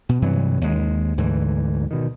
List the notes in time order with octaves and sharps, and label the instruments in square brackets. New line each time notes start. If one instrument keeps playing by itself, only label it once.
[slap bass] B2
G2 C3 E3 F#3
D#2 G#3
D2 G#2 D3 E3
B2 D#3